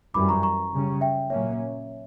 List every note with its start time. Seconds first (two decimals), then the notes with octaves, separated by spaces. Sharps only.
0.14 F#2 E3 G3 B5 D6
0.29 A#5 C#6
0.43 A#5 C#6
0.73 C#3 G3 C#4
1.01 E5 G5
1.30 A#2 F#3 A#3 C#4 C#5 E5